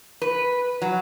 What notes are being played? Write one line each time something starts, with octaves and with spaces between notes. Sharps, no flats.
B4
F#3